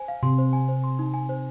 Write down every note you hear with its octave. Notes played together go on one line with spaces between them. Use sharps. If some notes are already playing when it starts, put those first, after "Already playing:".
Already playing: C5 G#5
F5
C3 C6
C5
G#5
C5
C6
D#4
G#5
C5